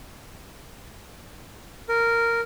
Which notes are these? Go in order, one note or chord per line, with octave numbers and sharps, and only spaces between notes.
A#4